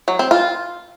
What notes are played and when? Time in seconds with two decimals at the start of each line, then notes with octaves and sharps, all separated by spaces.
0.08 F#3
0.19 C4
0.31 F4